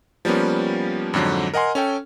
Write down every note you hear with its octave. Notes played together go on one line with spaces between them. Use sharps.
F3 G3 A#3 B3 C#4
F2 G#2 D3 F#3
A#4 D#5 F#5 G#5 C6
C#4 A4 G5